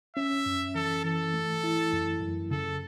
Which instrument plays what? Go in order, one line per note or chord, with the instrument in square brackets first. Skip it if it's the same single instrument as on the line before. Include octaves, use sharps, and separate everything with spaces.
[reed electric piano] C#4 [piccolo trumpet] E5
[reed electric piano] F#2
[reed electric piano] E3 [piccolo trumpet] A4
[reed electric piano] E3 [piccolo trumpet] A4
[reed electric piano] A3
E4
F#2
F#2
[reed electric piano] C#3 [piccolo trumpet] A4